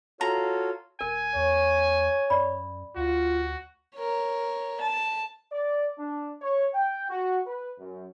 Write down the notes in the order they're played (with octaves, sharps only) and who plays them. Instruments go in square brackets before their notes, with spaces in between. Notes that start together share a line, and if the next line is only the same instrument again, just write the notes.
[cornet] F4 [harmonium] F#4 A4 C#5 [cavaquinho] A#5
[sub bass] D#1 [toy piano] A#4 [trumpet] G#5
[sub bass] E2 [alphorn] C#5
[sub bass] F#2 [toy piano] D5 B5
[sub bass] D2 [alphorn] F4 [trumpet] F#4
[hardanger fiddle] A#4 C#5
A5
[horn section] D5
D4
C#5
G5
F#4
B4
F#2